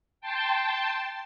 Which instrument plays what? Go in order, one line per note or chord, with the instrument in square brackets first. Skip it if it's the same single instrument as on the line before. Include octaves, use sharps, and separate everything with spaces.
[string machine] G5 A5 C6